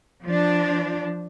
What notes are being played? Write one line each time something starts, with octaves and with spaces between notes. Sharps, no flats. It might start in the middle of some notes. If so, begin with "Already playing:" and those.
F3 D4